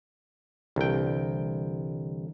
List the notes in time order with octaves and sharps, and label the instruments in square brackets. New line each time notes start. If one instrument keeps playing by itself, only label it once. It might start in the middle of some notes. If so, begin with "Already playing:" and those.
[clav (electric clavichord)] C2 G5 [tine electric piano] D3 E3